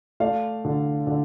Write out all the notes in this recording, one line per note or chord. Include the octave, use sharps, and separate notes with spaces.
A3 D5 F5
D3
D3